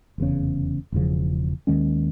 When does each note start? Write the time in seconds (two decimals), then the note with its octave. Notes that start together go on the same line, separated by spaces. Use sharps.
0.18 F1 E2 C#3
0.92 E1 E2 C#3 F3
1.67 D#2 D#3 G#3 C#4